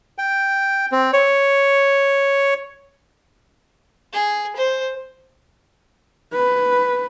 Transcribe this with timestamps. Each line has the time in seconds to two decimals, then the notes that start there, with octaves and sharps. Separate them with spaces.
0.18 G5
0.92 C4
1.13 C#5
4.13 G#4
4.56 C5
6.33 B4